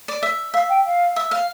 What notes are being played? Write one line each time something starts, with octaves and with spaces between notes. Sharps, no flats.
D5
E5
E5 F5
G5
F5
E5
F5